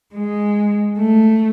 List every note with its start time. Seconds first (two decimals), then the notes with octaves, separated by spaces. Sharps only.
0.15 G#3
0.99 A3